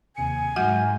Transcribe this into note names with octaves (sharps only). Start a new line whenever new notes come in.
D#2 C3 G#5 C#7
G#2 F#3 F#4 F#5 F6 G6